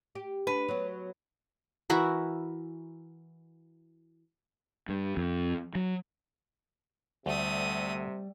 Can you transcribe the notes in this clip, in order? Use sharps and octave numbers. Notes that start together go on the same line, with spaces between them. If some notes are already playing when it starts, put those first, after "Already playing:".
G4
D4 B4
F#3 B3
E3 E4 F#4 A#4
G2
F2
F#3
D2 C3 G3 A3 D#6